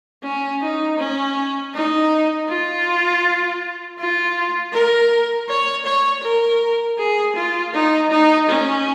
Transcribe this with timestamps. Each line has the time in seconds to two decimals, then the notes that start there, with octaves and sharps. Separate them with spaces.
0.23 C#4
0.62 D#4
0.99 C#4
1.74 D#4
2.48 F4
3.98 F4
4.73 A#4
5.49 C#5
5.86 C#5
6.23 A#4
6.98 G#4
7.35 F4
7.74 D#4
8.11 D#4
8.49 C#4